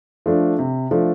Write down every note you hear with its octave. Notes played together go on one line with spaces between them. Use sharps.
F3 A3 D4
C3
F3 A3 D4